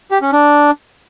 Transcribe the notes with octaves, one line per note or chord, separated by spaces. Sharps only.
G4
C#4
D4